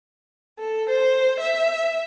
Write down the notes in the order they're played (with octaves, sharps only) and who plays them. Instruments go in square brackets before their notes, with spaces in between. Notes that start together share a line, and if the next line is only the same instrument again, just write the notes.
[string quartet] A4
C5
E5